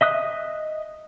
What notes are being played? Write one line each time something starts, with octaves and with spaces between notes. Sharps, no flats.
D#5 E5 D#6 F#6